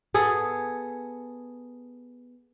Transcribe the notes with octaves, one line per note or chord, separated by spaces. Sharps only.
B3 G#4 A4